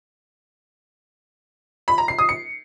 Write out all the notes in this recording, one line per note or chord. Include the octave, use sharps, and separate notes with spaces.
B5
A#5
C7
D#6
C#7